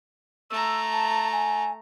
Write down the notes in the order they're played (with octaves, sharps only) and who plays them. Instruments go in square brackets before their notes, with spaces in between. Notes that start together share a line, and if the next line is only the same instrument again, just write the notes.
[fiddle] A3 A#5 [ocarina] E6
[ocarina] A5
G#5